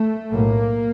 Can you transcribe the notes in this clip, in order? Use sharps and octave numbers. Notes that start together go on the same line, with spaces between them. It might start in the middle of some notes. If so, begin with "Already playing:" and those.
Already playing: A3
B1 A2 A#3